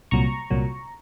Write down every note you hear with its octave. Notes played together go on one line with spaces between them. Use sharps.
C2 A#2 F#3 A#5 C#6
C2 A#2 F#3